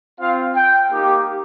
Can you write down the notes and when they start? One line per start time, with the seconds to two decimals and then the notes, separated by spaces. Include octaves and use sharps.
0.20 C4 F4 F5
0.56 G5
0.92 A#3 D#4 G4